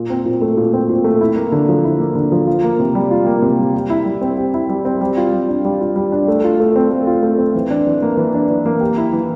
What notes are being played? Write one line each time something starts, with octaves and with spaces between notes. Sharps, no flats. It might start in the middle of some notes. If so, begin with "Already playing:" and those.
Already playing: A#2
C4
A#2
A3
A#2
C4
A#2
A3
E4
A#3
D3
F3
E4
A#3
D3
F3
F4
A#3
C3
G3
F4
A#3
C3
G3
G4
E4
G3
C4
G4
E4
G3
C4
G3
F4
G3
D4
G3
F4
G3
D4
A3
F4
A3
C4
A3
F4
A3
C4
E3
D4
E3
A#3
E3
D4
E3
A#3
G4
E4
E3